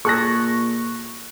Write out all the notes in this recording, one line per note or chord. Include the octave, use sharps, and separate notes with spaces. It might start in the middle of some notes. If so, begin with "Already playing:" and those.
A#2 G#4 A4 C#6 F#6 A#6